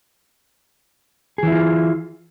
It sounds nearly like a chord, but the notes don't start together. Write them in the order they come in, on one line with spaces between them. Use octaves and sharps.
G#4 E3 E4 F4